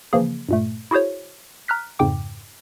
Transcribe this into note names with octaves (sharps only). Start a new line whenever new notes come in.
C#3 E3 F3 A#3 G#4
G2 A#2 A3
E4 F#4 G#4 C5 C#5
A#5 F6 F#6 B6
F2 G#2 C#3 G5 D6